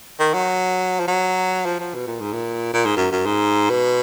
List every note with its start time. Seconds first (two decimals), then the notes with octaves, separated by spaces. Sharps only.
0.19 D#3
0.34 F#3
1.00 F3
1.07 F#3
1.65 F3
1.80 F3
1.94 B2
2.07 A#2
2.20 G#2
2.33 A#2
2.73 A#2
2.85 G#2
2.97 F#2
3.12 F#2
3.26 G#2
3.70 B2